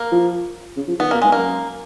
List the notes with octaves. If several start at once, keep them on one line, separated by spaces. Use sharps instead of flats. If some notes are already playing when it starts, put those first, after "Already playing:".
Already playing: A#3
F3
C#3
F3
D#3 B3
B2 A#3
G#2 G#3
F#2 A#3